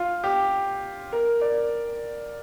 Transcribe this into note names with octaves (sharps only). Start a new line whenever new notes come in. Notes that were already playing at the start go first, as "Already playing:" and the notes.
Already playing: F4
G4
A#4
D5